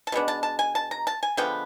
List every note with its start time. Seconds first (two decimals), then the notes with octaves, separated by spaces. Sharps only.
0.07 A5
0.12 B2 G#3 B3 D4
0.28 A5
0.43 A5
0.59 G#5
0.75 A5
0.91 A#5
1.07 A5
1.23 G#5
1.37 D3 F3 G#3 B3 G5